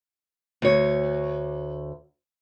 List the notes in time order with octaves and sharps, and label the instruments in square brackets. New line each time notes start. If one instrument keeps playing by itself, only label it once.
[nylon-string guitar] D2 C#5